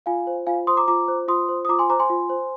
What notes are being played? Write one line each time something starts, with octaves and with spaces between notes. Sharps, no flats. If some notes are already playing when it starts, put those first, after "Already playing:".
F4 F5 G#5
C5
F4 F5 G#5
C5 C6 D#6
A#5 D6
F4 A#5 D6
C5
F4 C6 D#6
C5
D#6
F4 A#5 D6
G#5 C6
C5 A#5 D6
G#5 C6
F4
C5